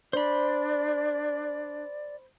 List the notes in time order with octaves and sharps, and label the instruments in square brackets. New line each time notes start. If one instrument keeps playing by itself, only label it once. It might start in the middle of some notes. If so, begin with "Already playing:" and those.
[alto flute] D4 [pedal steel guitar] C5 B5 [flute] D5